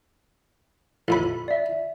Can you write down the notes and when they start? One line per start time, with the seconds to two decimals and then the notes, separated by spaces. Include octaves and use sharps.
1.08 A1 F2 B5
1.48 D5 E5